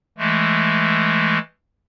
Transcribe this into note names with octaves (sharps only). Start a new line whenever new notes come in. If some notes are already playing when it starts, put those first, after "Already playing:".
E3 G#3 A3